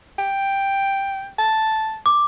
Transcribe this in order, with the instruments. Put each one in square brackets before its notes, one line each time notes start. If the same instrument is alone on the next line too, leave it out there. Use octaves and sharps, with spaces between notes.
[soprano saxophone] G5
A5
[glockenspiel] D6